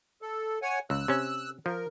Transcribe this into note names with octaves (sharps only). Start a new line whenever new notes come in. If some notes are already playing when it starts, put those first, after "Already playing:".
A4
C#5 F#5 G#5
C#2 E6 F#6
C3 C#4
F3 A#4